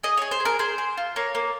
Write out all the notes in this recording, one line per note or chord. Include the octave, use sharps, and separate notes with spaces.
G#4 D#5
G#4 C#5
C5
G#4
A#4
G#4 C5
G#4
F4
A#3 C#5
A#3